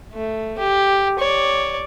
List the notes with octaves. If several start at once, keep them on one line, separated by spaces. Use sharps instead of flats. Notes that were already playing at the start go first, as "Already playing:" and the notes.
A3
G4
C#5 D5